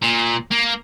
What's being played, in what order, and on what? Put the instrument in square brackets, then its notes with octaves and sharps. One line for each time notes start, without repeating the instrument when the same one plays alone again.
[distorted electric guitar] A#2
A#3